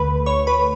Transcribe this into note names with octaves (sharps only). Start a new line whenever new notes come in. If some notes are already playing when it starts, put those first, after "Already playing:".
Already playing: D2 D3 A3 B4 B5
C#5 C#6
B4 B5